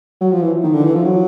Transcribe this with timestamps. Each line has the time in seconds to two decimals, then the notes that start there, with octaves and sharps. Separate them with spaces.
0.21 F#3
0.33 F3
0.42 E3
0.64 D#3
0.74 D3
0.84 E3
0.95 F3
1.05 F#3